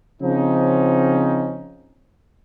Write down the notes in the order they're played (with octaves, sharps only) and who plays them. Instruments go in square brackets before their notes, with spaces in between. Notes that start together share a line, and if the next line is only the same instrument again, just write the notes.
[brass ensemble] C#3 F3 C4 C#4 D#4